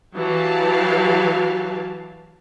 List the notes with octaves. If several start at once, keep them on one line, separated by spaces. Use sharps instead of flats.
E3 F#3 G4 F5 A5